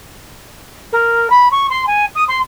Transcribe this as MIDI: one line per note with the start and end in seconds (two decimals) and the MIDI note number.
0.92 1.27 70
1.30 1.48 83
1.51 1.67 85
1.70 1.86 84
1.87 2.05 80
2.15 2.24 87
2.28 2.39 84